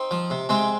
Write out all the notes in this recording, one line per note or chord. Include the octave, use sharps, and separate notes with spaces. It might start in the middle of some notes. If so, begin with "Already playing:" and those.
Already playing: C4 D#4
F3
C3
C3 G#3 C4